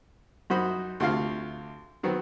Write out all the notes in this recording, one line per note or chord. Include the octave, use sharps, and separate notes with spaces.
F#2 D#4 F#4 C5 B5
D2 C3 A3 F4 F5
D#3 F#3 B3 C4